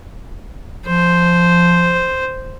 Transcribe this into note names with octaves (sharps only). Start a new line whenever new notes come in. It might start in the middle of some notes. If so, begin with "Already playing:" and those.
F3 C5